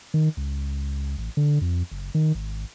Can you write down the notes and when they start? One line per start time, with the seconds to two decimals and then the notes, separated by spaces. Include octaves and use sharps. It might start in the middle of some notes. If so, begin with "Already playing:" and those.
0.14 D#3
0.37 C#2
1.18 A1
1.37 D3
1.61 F2
1.92 F#1
2.15 D#3
2.35 G#1